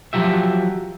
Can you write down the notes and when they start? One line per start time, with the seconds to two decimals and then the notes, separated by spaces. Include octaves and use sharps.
0.13 F3 F#3 G4 E5